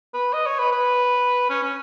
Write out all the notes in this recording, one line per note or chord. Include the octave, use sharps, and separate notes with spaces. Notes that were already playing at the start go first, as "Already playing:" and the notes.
B4
D#5
C#5
B4
B4
C#4
C#4